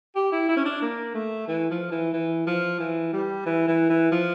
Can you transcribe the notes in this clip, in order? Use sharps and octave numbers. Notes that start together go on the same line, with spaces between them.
G4
E4
E4
C#4
D4
A#3
A3
E3
F3
E3
E3
F3
E3
G3
E3
E3
E3
F3